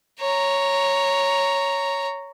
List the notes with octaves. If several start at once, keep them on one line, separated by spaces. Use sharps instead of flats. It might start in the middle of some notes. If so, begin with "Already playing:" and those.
C#5 A#5